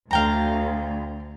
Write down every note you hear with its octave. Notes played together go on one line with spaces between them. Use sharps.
D2 F5 G5 A#5